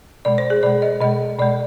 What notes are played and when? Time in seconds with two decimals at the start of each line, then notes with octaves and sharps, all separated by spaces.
0.25 B2 G#3 D5
0.38 C5
0.50 G#4
0.63 B2 G#3 D5
0.82 D#5
1.01 B2 G#3 D#5
1.39 B2 G#3 D5